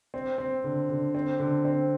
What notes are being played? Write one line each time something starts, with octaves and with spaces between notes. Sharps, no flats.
C4
C4
D3
D3
C4
D3
C4